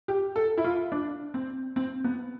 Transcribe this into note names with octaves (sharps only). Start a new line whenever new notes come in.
G4
A4
E4
F4
D4
C4
C4
B3